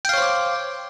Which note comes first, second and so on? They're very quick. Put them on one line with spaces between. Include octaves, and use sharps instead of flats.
G5 F5 C#5 C5 D6